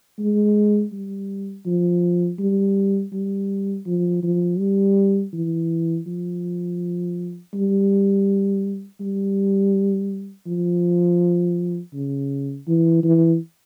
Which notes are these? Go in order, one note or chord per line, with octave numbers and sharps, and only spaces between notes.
G#3
G3
F3
G3
G3
F3
F3
G3
E3
F3
G3
G3
F3
C#3
E3
E3